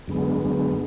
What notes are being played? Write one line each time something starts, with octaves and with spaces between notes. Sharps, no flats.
F#2 D3 G#3 B3
F#2 D3 G#3 B3